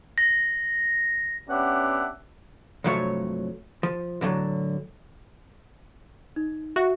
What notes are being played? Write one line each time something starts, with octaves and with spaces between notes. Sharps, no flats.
A#6
B3 C#4 D4 G4 E5 F#5
C2 G2 F3 F#3 A3 C#5
F3
A2 D3 D#3 F#3
D#4
F#4 E5